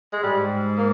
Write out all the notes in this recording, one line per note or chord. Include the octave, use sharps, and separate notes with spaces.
G#3
G#2 G3
A#3